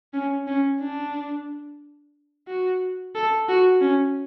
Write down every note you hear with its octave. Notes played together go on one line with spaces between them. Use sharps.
C#4
C#4
D4
F#4
A4
F#4
C#4